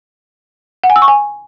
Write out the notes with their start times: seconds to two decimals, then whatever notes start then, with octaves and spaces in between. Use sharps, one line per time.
0.84 F#5
0.90 G#5
0.96 E6
1.02 C#6
1.08 G#5